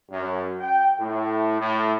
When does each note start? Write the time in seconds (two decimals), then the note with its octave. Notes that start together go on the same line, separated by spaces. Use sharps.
0.11 F#2
0.60 G5
0.99 A2
1.61 A2